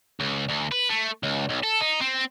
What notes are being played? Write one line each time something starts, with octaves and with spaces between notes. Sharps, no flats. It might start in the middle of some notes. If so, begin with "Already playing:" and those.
C#2
D2
B4
A3
C#2
B1
A4
D#4
C4